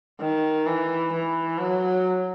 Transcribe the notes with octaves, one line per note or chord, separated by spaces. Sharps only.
D#3
E3
E3
F#3